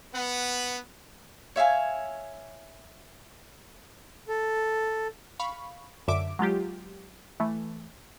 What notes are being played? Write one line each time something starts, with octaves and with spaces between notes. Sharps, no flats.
B3 B4 F#5
C#5 E5 F5 G#5
A4
F5 B5 C#6
F#2 D3 E5 D6 D7
F#3 G#3 F4 G4
E3 A3